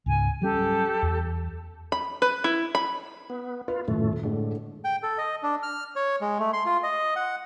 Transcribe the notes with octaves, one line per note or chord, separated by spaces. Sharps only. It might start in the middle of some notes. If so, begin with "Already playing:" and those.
C#2 G#2 C#3 G#5
F#3 G3 C#4 G4 A4
E2
B5
B4
E4
B5
B3
F4 B4
D#1 F#2 A2 A3
A2 D3 G#3
G5
A4
D#5
D4
F6
C#5
G#3
A3
C6
F4
D#5
F#5